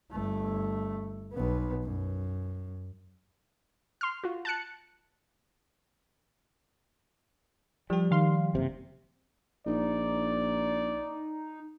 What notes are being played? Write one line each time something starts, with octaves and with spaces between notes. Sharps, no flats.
G1 A3
B1 B3
F#2
C6 F6
F4 F#4
A5 F#6 C#7
F3 G3 G4
D#3 F5 C6
F#1 C3
A#1 D#4 D5